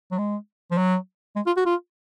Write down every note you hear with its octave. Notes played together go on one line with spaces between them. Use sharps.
F#3
G#3
F3
F#3
G#3
F4
F#4
F4